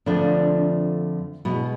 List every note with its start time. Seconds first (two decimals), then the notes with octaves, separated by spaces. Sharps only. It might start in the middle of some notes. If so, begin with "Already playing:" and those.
0.06 F2 D3 F3 A3 D4
1.45 B2 G#3 E4